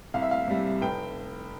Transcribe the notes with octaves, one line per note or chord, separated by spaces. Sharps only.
C2 F5
E5
F5
C3 G3
F1 G5